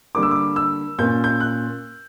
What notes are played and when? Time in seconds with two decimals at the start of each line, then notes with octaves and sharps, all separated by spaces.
0.15 D3 G3 A#3 D6
0.23 E6
0.31 D6
0.56 E6
0.99 A#2 A#3 C#4 G6
1.24 G6
1.40 F#6